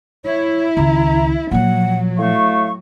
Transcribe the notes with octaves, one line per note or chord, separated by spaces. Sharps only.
E4 C#5
C#2 D#3 A#5
A#2 F3 F#3 F#5
A2 A3 F5 C#6